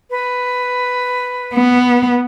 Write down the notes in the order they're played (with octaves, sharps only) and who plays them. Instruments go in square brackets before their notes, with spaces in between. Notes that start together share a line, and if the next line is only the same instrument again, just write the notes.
[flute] B4
[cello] B3